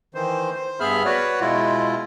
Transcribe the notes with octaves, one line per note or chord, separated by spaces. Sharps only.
D#3 E3 C5
C5
G2 B3 G#4 E5 B5 F6
F#4 B4 C#5 D5
B2 G#3 E4 F4